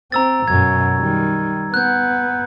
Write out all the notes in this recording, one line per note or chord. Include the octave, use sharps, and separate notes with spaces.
C4 A#5 E6 A6
F#2 B2 G#6
D#3 G3
B3 F#6 G6